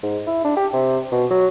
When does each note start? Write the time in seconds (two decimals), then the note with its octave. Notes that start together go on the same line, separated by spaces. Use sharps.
0.03 G#2
0.27 E4
0.45 D4
0.57 G4
0.73 C3
1.12 B2
1.31 F#3